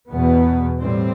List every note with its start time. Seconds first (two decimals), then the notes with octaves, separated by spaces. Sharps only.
0.09 E2 B2 B3
0.78 A2 G3 C4